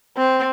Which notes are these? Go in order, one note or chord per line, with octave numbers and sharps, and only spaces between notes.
C4